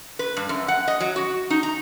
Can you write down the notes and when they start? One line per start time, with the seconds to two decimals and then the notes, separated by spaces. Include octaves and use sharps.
0.19 B4
0.37 G2
0.49 F#2
0.68 F#5
0.88 D#5
1.00 F#3
1.16 F#4
1.50 D#4
1.63 A#5